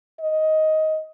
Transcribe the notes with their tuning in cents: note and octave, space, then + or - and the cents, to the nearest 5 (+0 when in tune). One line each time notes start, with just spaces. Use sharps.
D#5 +10